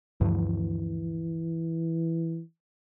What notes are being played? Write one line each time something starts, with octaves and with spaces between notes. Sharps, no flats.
D2 G2 E3 F3